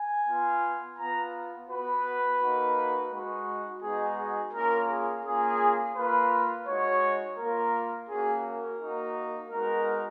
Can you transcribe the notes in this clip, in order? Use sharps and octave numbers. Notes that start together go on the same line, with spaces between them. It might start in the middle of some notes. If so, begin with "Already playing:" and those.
Already playing: G#5
B3 F4
B3 F4 A#5
B3 F#4 B4
A#3 D#4 F#4
G#3 D#4 F#4
G#3 B3 D#4 F#4 G#4
G#4
A#3 C#4 F4 A#4
G#4
A#3 C#4 F4 G#4
A#3 F4 B4
G#3 D#4 F#4 C#5
A#3 F4 A#4
A#3 C#4 F#4 G#4
A#4
A#3 D#4 F#4
G#3 B3 D#4 F#4 A#4